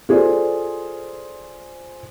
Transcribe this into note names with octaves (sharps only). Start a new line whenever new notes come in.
F4 G#4 A4 C5 D5